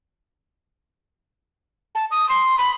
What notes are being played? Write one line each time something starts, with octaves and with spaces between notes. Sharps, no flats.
A5
D#6
C6
B5